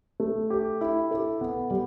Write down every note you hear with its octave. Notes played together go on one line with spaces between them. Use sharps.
A3
G4
E4
A4
B3
G3